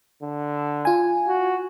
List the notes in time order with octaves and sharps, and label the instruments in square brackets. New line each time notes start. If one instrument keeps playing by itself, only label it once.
[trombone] D3
[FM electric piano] F4 G#5
[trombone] F#4